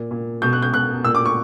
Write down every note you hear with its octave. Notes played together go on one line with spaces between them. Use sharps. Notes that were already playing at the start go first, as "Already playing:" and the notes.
Already playing: A#2
A#2
B2 G6
F#6
G6
B2 F#6
A#2 E6
D6
C#6